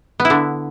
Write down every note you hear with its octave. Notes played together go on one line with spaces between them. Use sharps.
B3
E4
D3